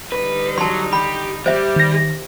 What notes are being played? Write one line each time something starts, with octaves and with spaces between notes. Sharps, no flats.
D3 G3 D#4 B4
F#3 A5 C6
G4 B5
G3 G4 C5 E5
D#3 A#6